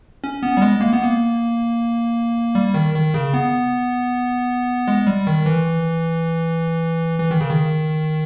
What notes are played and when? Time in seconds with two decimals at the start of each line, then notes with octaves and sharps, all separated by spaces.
0.24 C#4
0.43 B3
0.57 G3
0.62 G#3
0.81 A#3
0.92 B3
1.03 A#3
2.55 G3
2.74 D#3
2.94 D#3
3.14 C#3
3.34 B3
4.88 G#3
5.07 G3
5.27 D#3
5.46 E3
7.20 E3
7.31 D#3
7.41 C#3
7.50 D#3